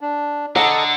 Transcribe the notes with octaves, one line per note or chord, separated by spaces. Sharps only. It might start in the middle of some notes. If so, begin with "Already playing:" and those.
D4
D3 A4 D#5 F#5 A#5